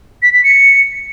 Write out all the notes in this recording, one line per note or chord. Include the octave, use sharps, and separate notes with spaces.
B6
B6
C#7